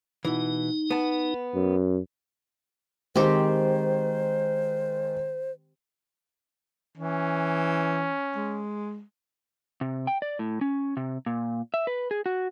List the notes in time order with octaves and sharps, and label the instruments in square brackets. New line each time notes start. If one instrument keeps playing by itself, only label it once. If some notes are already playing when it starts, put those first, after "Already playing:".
[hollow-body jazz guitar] B2 E3 [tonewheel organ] D#4
[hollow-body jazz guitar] B3 A5
[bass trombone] F#2
[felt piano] D#3 G#3 [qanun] C4 G4 [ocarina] C5
[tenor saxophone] E3 [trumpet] C#4
[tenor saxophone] G#3
[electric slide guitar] C3
G5
D5
A2
C#4
C3
A#2
E5
B4
G#4
F#4